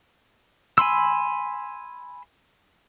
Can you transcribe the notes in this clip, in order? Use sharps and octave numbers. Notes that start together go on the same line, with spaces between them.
G#5 B5 C6 E6